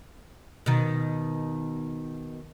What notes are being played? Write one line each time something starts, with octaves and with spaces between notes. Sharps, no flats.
B2 D#3